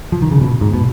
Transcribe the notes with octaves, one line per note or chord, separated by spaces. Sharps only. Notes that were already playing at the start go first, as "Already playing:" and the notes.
F3
D#3
C#3
B2
G#2
B2